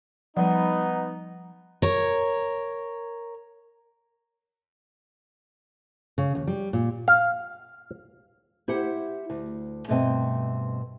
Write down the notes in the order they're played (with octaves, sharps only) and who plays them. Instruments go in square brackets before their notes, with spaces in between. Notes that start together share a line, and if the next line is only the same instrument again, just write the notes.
[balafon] F3 G3 [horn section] B3 D#4
[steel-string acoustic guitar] A#4 C#5
C#3
D#2
G3
A#2
[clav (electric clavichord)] F5
[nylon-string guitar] E4 G4 C5 F#5
D2
G2 B2 A3 C4 D#5 G5